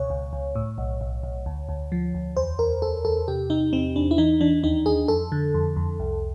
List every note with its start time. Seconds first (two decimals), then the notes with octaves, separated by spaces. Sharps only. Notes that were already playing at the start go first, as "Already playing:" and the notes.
Already playing: C#2 B2 C#5
0.10 C#2
0.33 C#2
0.55 A2
0.78 B1
1.01 B1
1.23 B1
1.46 D2
1.69 D2
1.92 F3
2.14 D2
2.37 E2 C5
2.59 E2 A#4
2.82 E2 A4
3.05 E2 A4
3.28 C3 G4
3.50 C3 D#4
3.73 E2 C4
3.96 E2 D4
4.11 E4
4.18 E3 D#4
4.41 E3 D4
4.63 D#2 D#4
4.86 D#2 G#4
5.08 F2 A4
5.32 D3
5.54 F2
5.77 F2
5.99 C2